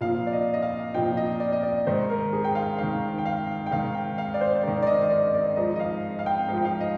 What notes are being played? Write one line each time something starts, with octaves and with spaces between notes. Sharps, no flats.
A#2 F3 F5
D5
D#5
D#5
F5
A#2 F3 G5
D#5
D5
D#5
D5
G#2 D#3 C5
A#4
G#4
G5
F5
G#2 D#3 F5
G5
F5
G5
G#2 D#3 F5
G5
F5
D5
C5
G#2 D#3 D5
D5
D#5
D#5
D5
D5
G#2 F3 D#5
D#5
F5
F5
G5
G#2 F3 F5
G5
F5
D#5